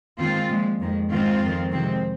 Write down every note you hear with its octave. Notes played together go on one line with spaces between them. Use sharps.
D#2 D#3 G#3 C4 F4
A#2 F3 G#3
F2 D#3 G#3
G#2 D#3 G#3 C4 F4
F2 D#3 G#3
F2 C3 D#3 G#3 C4